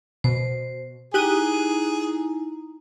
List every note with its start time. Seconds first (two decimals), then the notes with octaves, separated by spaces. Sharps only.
0.24 B2 C5
1.14 D#4 E4 G4 G#4 A#5 F#6 D#7